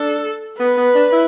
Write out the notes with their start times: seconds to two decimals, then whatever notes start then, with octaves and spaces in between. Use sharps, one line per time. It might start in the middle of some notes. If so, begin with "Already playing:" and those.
Already playing: D4 A4
0.59 B3 B4
0.77 B3
0.94 D4
1.12 E4